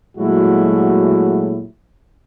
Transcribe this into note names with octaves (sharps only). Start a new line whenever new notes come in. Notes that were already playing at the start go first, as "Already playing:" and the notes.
A#2 F#3 G#3 A3 E4 F#4